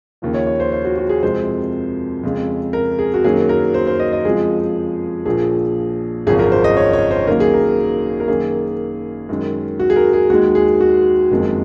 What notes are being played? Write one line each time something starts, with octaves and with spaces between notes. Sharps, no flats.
D#2 C#3 F3
C#5
C#5
C5
C5
F#4
F#4
G#4
F2 C3 F3 G#3 C5
F2 C#3 G#3
A#4
G#4
F#4
F#2 D#3 F#3 A#3 G#4
A#4
C5
C5
D#5
D#5
F2 C#3 F3 G#3 G#4
A#1 A#2 F3 G#4
G#1 F#2 C#3 F3 G#4
A#4
C5
D#5
C#5
C#5
C5
F#2 D#3 F#3 A#3 A#4
G#4
A#4
A#4
F#2 D#3 A#3 G#4
F#2 D#3 G#3
F#4
G#4
A#4
G#4
D#2 D#3 G#3 F#4
G#4
F#4
F#1 F2 D#3 G#3